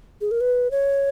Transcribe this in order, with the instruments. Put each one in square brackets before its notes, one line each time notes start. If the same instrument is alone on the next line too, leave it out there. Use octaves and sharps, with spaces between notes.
[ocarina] G#4
A#4
B4
C#5